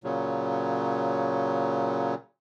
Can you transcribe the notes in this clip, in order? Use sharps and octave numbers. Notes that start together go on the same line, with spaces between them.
A#2 C#3 F#3